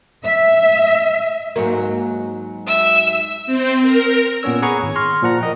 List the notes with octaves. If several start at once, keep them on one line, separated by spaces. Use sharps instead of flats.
E5
G#2 F#3 A#3
E5 E6
C4
A#4
A#2 B3 C#4 C#5 E6
G#4 C#5 F#5 A#5 B5 C#6
G#1
C6 C#6 F6 A#6
A#2 F3 F#5 A#5
A#4 D#5 G5